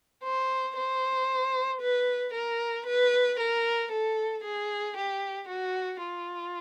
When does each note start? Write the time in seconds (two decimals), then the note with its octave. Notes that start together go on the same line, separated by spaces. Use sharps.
0.24 C5
0.77 C5
1.82 B4
2.34 A#4
2.86 B4
3.39 A#4
3.92 A4
4.44 G#4
4.97 G4
5.49 F#4
6.02 F4